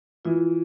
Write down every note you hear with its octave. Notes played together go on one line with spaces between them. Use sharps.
E3 F4